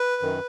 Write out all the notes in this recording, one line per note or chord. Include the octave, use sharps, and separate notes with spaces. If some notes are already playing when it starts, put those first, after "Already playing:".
Already playing: B4
F#2 D#3